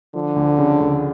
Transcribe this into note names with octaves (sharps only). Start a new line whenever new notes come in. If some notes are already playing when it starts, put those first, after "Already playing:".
D3 F3
D2
C#3
D2